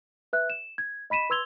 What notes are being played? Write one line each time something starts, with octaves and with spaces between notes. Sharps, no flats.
B4 E5 F#6
E7
G#6
D#5 B5 B6 D#7 E7
B4 C6 E6 G#6 F7 G7